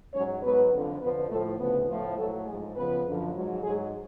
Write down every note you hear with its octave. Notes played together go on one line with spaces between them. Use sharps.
G#2 F#3 C#4 C#5
G#2 F#3 B3 B4
F2 D3 F3
F2 D3 F3 B3 B4
A2 F3 A3 A4
D2 C#3 F3 B3 B4
A2 F3
A2 F#3 A3 A4
G#2 F3 G#3 G#4
F2 C#3 F3 B3 B4
F#2 D3 F3
G#2 F#3
G#2 F#3 G#3 G#4